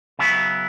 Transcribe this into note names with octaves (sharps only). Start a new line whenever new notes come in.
C#3 F#3 B3 E4